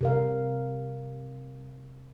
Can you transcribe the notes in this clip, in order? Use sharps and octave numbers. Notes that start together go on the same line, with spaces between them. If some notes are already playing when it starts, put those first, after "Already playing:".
C3 A#4 F5